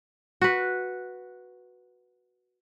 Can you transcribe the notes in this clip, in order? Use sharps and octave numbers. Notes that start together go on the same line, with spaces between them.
F#4 B4